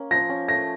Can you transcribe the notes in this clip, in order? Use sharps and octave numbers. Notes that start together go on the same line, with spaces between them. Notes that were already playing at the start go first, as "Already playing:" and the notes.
Already playing: A#3 C#4
F3 A#6
C#4
A3 A#6